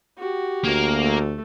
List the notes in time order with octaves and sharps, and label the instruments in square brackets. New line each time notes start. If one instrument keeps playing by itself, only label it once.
[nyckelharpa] F#4 G4
[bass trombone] D2 [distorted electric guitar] A#3 A#4
[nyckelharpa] A3